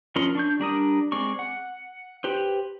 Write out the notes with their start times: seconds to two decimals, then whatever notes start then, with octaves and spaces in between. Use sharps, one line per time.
0.16 F3 C#4 A#4 D#5 C6
0.35 D4 C#6 G6
0.59 G3 D4 A#4 D#6
1.12 G#3 C4 D5 C#6
1.39 F#5
2.24 G4 B4 C5